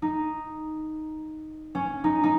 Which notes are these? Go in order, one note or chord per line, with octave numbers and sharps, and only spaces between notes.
D#4
C#4
D#4
D#4